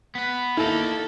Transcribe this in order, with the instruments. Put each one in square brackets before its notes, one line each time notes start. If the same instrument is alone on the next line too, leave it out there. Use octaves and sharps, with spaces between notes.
[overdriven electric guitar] B3 B4
[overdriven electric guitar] A#3 D#4 [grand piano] E4 [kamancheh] A4